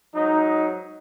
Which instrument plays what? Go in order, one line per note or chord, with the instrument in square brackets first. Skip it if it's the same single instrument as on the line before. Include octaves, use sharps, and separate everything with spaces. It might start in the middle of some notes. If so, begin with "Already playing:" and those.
[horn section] G#2 F#3 D#4